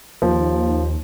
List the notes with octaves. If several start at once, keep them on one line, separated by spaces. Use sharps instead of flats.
D#2 F3